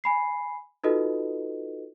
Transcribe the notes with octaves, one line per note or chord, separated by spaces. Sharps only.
G#5 B5 C7
D#4 F4 F#4 A4 B4 D#5